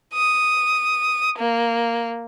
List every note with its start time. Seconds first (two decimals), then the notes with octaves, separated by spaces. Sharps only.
0.14 D#6
1.38 A#3